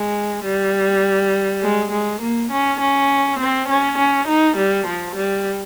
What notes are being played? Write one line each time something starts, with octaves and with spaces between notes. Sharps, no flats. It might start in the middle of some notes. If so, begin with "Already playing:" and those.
Already playing: G#3
G3
G#3
G#3
A#3
C#4
C#4
C4
C#4
C#4
D#4
G3
F3
G3